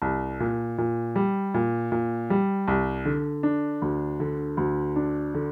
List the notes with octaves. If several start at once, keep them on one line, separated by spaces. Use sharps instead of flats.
C2
A#2
A#2
G3
A#2
A#2
G3
C2
D3
D4
D2
D3
D2
D4
D3